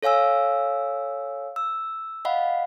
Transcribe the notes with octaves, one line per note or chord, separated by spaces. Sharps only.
A4 C#5 F5 G#5 E6
E6
D#5 F5 F#5 B5